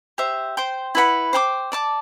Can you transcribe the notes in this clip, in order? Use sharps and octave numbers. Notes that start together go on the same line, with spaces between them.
G4 C5 E5
C5 G5 C6
E4 B4 F#5 B5
C5 G5 B5 D6
D5 A5 D6